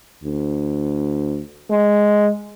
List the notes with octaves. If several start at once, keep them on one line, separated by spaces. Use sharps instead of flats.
D2
G#3